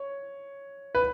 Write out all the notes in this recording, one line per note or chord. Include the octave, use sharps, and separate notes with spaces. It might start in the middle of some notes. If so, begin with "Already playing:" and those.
Already playing: C#5
B4